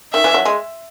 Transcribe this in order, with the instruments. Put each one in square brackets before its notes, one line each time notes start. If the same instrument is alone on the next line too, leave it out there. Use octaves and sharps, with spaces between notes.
[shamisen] D#3 [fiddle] E5
[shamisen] E3
F#3
G#3